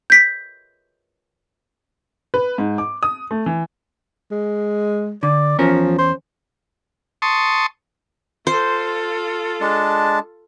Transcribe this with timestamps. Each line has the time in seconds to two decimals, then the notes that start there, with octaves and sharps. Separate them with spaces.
0.10 G6 B6
2.34 B4
2.58 G#2
2.78 D6
3.03 D#6
3.31 A3
3.46 E3
4.31 G#3
5.23 D3 D5
5.59 E2 F3 C#4 A#4
5.98 C5
7.22 A5 C6 C#6 D#6
8.47 F4 A4 C5
9.61 G#3 D4 A5